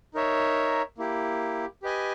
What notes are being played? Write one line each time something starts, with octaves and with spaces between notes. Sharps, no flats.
D#4 A#4 C#5 E5
A#3 E4 G4
G4 B4 D#5 G#5